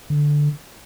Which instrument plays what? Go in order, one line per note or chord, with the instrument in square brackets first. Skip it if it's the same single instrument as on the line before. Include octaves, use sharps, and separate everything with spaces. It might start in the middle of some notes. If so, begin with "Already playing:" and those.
[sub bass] D3